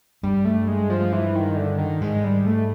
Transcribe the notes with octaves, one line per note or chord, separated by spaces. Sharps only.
G2 G3
A3
G#3
F3
E3
D#3
D3
D#3
G#2 G#3
G3
A3